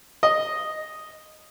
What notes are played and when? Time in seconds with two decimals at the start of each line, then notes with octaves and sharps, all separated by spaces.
0.23 D#5